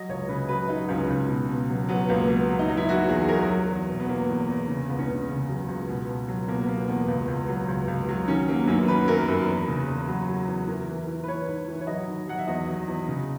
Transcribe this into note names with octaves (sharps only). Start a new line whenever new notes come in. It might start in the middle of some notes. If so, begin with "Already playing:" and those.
Already playing: F#3 D#5
C#2 C#5
C#3 B4
F#3 B4
F#3 D#4
C#2 C#4
C#2
B2
B2
F#3
F#3 B3
C#2 A#3
F#3 B3
F#3
D#4
F#3
E4
F#3 F#4
E2 G#4
F#3 A#4
F#3
E2
B2
B3
E2 A#3
E2
E2
C#3
C#2 B3
C#4
C#3
C#3
F#3
C#2
B2 B3
B2
F#3
B2 A#3
B3
F#3 A#3
E2 B3
C#2
C#2
F#3
C#2
C#2
F#3
D#3 C#4
F#3 A#3
B3
F#2 C#4
D#3 B4
F#2 A#4
F#2 B4
E2
C#3
E2
F#3
F#3
E2
E3 A#4
E3
E3
B4
E3 C#5
G#2
E3
C#5
F#3 D#5
D#3
F#3 F#5
E5
E2 D#5
F#3
E2
C#3